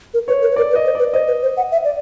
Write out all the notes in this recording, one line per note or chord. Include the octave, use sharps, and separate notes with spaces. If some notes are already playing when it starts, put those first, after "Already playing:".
A#4
B4 C#5
A#4
B4
A#4 D5
B4
D#5
C5
B4 D5
C5 D#5
B4
C5
F#5
E5
D5